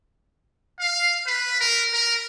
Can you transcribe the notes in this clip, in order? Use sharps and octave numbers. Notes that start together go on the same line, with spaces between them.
F5
B4
A#4
A#4